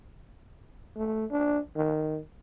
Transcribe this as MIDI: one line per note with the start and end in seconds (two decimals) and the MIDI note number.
0.97 1.25 57
1.31 1.59 62
1.76 2.19 51